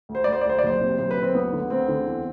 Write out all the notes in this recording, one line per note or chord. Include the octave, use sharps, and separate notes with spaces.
D2
C5
D2 D5
C5
D5
D2 C5
D5
F#1 C5
C3
F#1 C5
B4
F#1
C4
D2 B3
D3
D2 C4
D3
E2